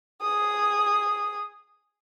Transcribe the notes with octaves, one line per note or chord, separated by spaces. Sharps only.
G#4 D#6